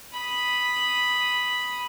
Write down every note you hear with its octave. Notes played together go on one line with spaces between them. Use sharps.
B5 D#6